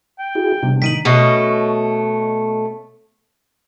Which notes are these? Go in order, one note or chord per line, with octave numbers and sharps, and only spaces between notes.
G5
E4 F#4 G#4
C3 G3 B3 D4
A2 D#3 D#4 B6 D7 D#7 F#7
B2 A3 C#4 D#5